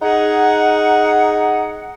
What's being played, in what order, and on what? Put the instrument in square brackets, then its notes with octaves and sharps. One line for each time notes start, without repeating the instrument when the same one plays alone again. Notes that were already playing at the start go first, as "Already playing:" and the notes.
[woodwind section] D#4 G#4 D#5 F#5